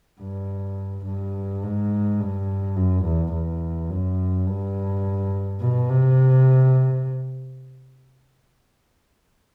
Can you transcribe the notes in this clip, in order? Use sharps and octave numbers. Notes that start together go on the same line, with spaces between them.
G2
G2
G#2
G2
F#2
E2
E2
F#2
G2
B2
C3